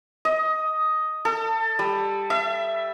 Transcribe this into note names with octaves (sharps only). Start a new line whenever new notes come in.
D#5
A4
G3
E5